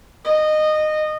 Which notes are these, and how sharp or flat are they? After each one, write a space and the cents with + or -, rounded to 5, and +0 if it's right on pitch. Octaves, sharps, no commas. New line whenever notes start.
D#5 -20